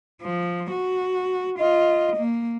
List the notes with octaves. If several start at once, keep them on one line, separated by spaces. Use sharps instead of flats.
F3
F#4
F4 D#5
A#3